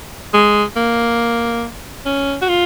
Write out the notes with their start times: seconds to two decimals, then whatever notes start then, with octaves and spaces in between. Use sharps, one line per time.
0.34 G#3
0.76 A#3
2.06 C#4
2.42 F#4
2.49 F4